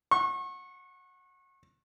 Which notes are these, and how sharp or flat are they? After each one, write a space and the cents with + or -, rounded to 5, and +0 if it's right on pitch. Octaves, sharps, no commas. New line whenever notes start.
F#5 -10 C#6 -35